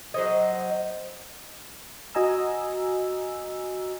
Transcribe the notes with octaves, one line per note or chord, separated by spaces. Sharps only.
F#3 C5 D#5
F#4 D#5 G#5 A#5 E6